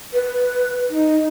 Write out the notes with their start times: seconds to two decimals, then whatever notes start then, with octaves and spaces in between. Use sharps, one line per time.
0.13 B4
0.90 D#4